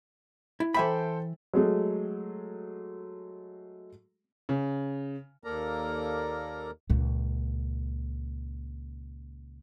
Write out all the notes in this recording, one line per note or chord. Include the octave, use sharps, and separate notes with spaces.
E4
E3 A4 C5 E5 G5 B5
F#3 G#3 A3
C#3
D#2 A#3 A4 A#4 D5 A#5
C#2 A#2